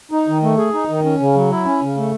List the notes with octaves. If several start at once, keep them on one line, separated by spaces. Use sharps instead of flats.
D#4
D#3
A3
G#4
D#4
D#3
C#4
C#3
F#3
E4
C#4
C#3
A3